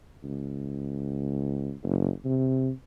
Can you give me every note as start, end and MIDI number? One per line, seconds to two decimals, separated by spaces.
0.23 1.72 37
1.83 2.09 30
2.25 2.70 48